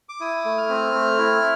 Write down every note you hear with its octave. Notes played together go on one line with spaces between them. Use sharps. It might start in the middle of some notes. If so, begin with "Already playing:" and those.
D6
E4 D#6
A3
F6
C4
A3
E4